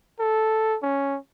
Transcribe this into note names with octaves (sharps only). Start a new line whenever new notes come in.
A4
C#4